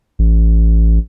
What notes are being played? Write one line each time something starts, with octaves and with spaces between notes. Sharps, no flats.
A1